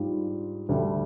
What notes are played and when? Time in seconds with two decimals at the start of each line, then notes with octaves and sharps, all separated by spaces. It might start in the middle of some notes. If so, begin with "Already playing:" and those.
Already playing: G#2 G3 D4 F4
0.69 D2 D3 G3